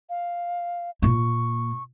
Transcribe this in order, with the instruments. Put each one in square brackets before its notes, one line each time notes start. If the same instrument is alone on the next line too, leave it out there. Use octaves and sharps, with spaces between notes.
[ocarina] F5
[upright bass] A#2 A#3 [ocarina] C#6